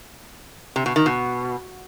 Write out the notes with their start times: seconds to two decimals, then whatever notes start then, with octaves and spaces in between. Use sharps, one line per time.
0.76 C3
0.86 B2
0.96 D#3
1.06 B2